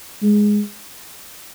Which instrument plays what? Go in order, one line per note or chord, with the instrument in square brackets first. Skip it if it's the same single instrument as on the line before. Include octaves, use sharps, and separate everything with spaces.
[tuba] G#3